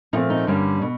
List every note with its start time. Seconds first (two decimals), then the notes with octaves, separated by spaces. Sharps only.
0.13 A#2 F3 A3 C4 D#4
0.30 D#4
0.47 G2 D3 G3 A#3 C#4
0.82 B2